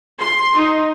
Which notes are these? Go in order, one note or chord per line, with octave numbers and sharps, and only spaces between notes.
C6
D#4